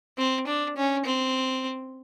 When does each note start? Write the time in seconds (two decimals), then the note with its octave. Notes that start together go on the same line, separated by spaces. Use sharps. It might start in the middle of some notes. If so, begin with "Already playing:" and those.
0.18 C4
0.47 D4
0.76 C#4
1.05 C4